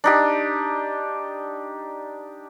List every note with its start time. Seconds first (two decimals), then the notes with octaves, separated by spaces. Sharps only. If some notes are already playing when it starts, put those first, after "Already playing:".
0.04 D4 D#4 G4